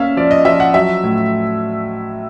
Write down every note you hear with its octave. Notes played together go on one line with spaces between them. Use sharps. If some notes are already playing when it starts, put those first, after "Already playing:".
Already playing: A#3 C#4 E5 F5
F3 D5
D#5
F3 E5
F#5
F#3 E5
A2